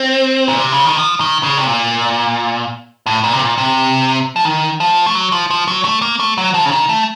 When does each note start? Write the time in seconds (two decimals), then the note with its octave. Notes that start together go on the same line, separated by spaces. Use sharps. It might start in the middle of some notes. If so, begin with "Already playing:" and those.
Already playing: C4
0.48 A#2
0.60 C3
0.72 C#3
0.85 D#3
0.97 F3
1.20 D#3
1.43 C#3
1.57 C3
1.66 A#2
3.06 A2
3.24 A#2
3.33 C3
3.41 A#2
3.58 C3
4.36 F3
4.45 D#3
4.80 F3
5.06 A3
5.15 F#3
5.32 F3
5.50 F3
5.68 F#3
5.85 A3
6.02 A#3
6.20 A3
6.38 F#3
6.54 F3
6.65 C#3
6.72 D#3
6.89 A3